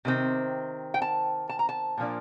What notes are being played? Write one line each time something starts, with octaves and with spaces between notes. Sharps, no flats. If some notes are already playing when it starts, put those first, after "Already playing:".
C3 D#3 C4
G5
A5
A5
A#5
A5
A#2 F3 A#3 D4